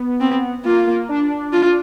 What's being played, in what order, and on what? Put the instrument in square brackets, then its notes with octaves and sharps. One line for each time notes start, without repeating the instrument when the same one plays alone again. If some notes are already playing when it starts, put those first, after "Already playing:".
Already playing: [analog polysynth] B3
[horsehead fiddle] C4
[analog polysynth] A#3 [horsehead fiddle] F4
[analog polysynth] A#3
D4
[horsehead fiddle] F4